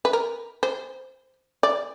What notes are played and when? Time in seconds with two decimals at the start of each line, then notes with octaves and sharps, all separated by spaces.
0.05 B4
0.13 A#4
0.63 C5
1.63 D5